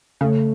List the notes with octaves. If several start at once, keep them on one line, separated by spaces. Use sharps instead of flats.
C#3 A3